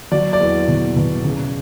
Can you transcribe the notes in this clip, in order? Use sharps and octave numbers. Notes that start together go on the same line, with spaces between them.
F#3 D5
D5
E2
B2
B2
C#3